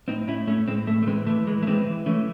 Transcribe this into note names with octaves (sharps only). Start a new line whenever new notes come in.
A2 C4 D#4
A2 C#4 E4
A2 A3 C#4
A2 G#3 C4
A2 A3
A3
E3 G#3 C4
E3 A3
E3 G#3
A3
E3 G#3 C4
E3
E3 A3 C#4